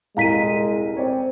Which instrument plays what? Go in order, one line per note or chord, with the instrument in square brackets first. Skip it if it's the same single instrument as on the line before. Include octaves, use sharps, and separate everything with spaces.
[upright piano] D#1 C2 A#5 [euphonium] G#3 [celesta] F5 B6 D#7
[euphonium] C4 [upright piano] C#5 D5